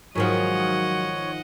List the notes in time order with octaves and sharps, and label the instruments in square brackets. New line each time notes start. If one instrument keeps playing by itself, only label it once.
[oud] G#2 D#3 F3 [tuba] F#3 [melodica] C#5 [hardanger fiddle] D#5 F#5